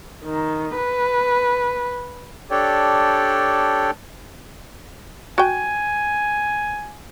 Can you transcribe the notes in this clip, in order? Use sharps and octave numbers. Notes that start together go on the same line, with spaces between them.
D#3
B4
D4 G4 A4 C#5 D5 G5
F#4 G5 G#5